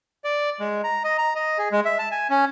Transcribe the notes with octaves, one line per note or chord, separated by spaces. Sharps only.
D5
G#3
A#5
D#5
A#5
D#5
G#4
G#3
E5
A5
G#5
C#4